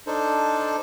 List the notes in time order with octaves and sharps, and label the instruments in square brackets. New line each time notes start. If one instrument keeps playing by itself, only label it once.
[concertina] D4 D#4 A4 C5